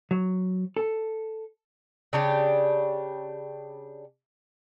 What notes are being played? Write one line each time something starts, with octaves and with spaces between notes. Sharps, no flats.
F#3
A4
C#3 D4 G4